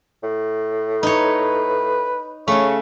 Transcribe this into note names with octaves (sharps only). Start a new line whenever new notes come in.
A2
D#4 B4 C#5
C#3 A3 C#4 C#5